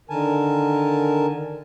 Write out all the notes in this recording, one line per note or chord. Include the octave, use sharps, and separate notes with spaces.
D3 D#3 A#4 G#5 A5